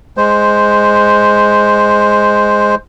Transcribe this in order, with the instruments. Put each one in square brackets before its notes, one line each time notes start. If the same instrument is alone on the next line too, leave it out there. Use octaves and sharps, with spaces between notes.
[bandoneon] G#3 C5